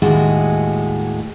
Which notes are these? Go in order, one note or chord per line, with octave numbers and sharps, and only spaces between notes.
D#2 A2 G#3 F#4 G#4